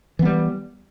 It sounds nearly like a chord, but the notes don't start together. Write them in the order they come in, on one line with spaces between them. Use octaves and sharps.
E3 B3 G3